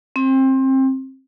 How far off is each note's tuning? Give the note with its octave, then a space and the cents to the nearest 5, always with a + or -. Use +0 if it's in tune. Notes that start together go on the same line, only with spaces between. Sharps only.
C4 +25